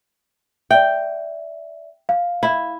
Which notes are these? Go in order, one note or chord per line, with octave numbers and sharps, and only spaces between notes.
D5 E5 G5
F5
E4